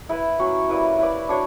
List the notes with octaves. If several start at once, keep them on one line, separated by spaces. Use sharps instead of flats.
E4 B4 E5
F#3 C#4 F#4
G3 A#3 E4 B4
E4 B4 D5
D4 F#4 C#5